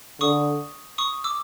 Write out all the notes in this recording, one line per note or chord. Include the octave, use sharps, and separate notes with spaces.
D3 C#6 D#6
C#6 D#6
D6 E6